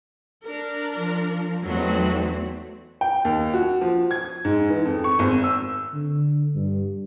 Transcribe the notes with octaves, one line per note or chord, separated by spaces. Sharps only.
D4 A#4
F3
E2 F#3 A3 C4 D#4 F#4
G5
D#2
F#4
F3
G#6
G#2
E3
F2
C#6
G#1
E6
D3
G2